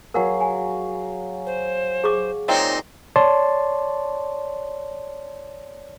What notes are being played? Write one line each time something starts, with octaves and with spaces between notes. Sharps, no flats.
F#3 G#4 A#4 F5 F#5
G#5
C5
G#4 C#6 D6
A#2 C4 D#4 C#5 F5
C#5 D5 A5 C6